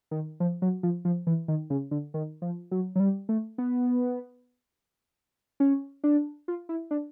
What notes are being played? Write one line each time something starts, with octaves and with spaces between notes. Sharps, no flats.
D#3
F3
F#3
F3
F3
E3
D#3
C#3
D3
D#3
F3
F#3
F#3
G3
A3
B3
C#4
D4
F4
E4
D4